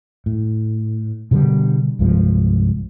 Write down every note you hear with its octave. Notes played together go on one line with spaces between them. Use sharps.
A2
B2 D3 F#3 G3
C2 G2 F3 G#3